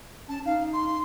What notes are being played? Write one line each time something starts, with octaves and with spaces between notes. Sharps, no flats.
C#4 A5
D#4 F5
C6